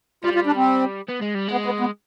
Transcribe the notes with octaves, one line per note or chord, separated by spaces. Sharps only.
G3 F4
F4
D4
C4
B3
G#3
G3
G#3 B3
B3
B3